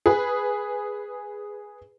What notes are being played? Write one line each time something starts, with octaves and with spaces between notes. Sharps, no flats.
G#4 B4